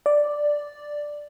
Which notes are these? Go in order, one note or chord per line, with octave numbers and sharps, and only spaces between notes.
D5